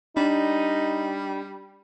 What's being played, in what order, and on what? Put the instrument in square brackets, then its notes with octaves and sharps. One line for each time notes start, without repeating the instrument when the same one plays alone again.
[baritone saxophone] G3 [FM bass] D4 [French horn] D#4